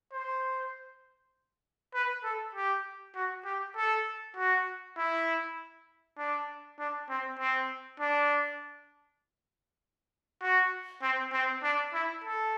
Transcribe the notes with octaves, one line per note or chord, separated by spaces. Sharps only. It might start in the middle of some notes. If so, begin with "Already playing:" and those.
C5
B4
A4
G4
F#4
G4
A4
F#4
E4
D4
D4
C4
C4
D4
F#4
C4
C4
D4
E4
A4